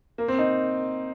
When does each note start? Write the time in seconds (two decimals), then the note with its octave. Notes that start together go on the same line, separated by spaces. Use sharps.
0.18 A#3
0.28 C4
0.38 D#4